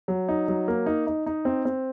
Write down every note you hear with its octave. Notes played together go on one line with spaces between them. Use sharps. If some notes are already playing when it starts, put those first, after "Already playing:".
F#3
D#4
F#3
A#3
D#4
D#4
D#4
C4
C4